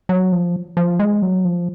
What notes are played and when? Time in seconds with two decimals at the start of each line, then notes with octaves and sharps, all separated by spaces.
0.09 F#3
0.32 F3
0.77 F3
1.00 G#3
1.22 F#3
1.45 F3